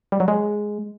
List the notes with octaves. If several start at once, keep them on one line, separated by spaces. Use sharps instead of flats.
G3
F#3
G#3